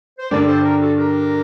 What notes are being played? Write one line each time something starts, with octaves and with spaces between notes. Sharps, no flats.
C5
G2 D3 G3 D4 A#4 D5
A4 C5
G4 A#4
F#4 A4
G4 A#4